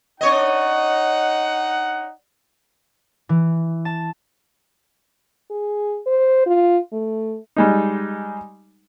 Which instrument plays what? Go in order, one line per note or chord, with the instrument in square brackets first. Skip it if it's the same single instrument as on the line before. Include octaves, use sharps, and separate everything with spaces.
[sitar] D4 C#5 D#5 [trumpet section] D#4 F#5
[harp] E3
A5
[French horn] G#4
C5
F4
A3
[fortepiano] G3 G#3 D#4